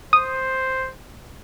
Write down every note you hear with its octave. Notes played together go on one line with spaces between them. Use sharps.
C5 D#6